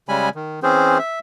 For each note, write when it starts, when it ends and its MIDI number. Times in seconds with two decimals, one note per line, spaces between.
0.09 0.29 49
0.09 0.29 55
0.09 0.29 56
0.09 0.29 80
0.09 0.29 83
0.35 0.60 51
0.63 0.98 52
0.63 0.98 60
0.63 0.98 61
0.63 0.98 68
0.63 0.98 72
0.99 1.19 76